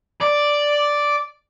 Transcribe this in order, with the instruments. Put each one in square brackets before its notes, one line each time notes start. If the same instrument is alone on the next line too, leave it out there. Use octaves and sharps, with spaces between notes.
[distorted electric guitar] D5